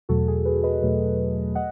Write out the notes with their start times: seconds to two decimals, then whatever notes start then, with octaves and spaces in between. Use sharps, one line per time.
0.09 E2 B2 F#3 A3 F#4 A4
0.28 G#4
0.45 G#4 B4
0.63 B4 D#5
0.82 E2 B2 F#3 A3
1.55 D#5 F#5